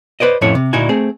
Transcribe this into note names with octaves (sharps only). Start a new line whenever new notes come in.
B4 C5 D5 D#5
F2 A2 A3 C#4 E4 C#5
C3
D2 A#2 D#4 E4 F#4 G#5
A3 C4 G#4